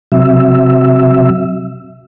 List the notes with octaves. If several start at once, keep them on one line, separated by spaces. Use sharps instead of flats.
C3 F#3 E5